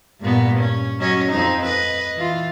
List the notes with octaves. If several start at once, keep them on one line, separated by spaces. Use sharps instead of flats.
G2 A#2 B3
C#4
F#3 C#4 D#5
F2 C4 D#4
B4 D#5
E3 F4